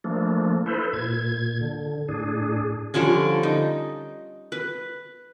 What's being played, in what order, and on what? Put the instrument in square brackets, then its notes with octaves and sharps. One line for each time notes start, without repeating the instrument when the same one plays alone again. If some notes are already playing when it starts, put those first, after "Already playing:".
[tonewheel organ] F3 A3 A#3 D4
E4 A4 B4 C5
A#2 G#6
D3
A2 D4 G#4
[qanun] D3 F3 G3 C#4
D#4
B4